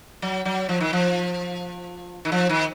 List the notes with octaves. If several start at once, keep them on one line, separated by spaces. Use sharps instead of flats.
F#3
F#3
F3
D#3
F3
D#3
F3
D#3